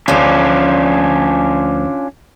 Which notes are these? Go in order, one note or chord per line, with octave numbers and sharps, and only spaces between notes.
D2 F3 C#4 D4 F4